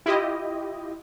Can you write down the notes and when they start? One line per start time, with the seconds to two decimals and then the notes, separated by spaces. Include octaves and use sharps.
0.06 E4 F4 G4 D#5